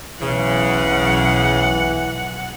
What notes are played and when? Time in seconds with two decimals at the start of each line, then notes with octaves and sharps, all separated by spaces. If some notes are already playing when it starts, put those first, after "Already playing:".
0.22 B1 C#3 E3 F#5